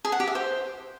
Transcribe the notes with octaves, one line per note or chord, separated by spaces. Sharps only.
G#4
F#5
G4
E5
C5